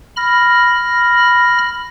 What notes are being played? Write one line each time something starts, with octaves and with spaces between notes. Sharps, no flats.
B5 F6 A#6